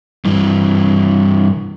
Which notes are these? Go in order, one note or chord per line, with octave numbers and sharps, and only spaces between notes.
G2 E3